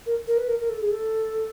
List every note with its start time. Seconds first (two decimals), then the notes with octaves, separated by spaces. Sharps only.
0.06 A#4
0.27 A#4
0.37 B4
0.48 A#4
0.59 A#4
0.70 A4
0.81 G#4
0.91 A4